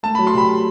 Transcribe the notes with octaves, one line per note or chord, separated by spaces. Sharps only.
A3 A5
B5
F#3
C6
C3 B5